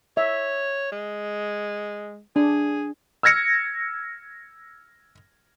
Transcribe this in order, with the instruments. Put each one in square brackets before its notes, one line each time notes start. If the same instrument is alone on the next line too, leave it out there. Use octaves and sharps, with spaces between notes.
[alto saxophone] C#5 [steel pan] E5
[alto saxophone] G#3
[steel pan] D4 [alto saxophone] G#4
[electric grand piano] E6 F6 G#6 A#6 C#7